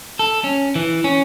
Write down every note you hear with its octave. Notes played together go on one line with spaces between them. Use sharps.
A4
C#4
E3
C#4